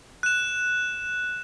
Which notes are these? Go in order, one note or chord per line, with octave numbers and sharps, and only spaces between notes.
F#6 E7